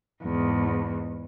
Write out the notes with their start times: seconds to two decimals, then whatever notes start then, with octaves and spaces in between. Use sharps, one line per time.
0.23 E2 G#2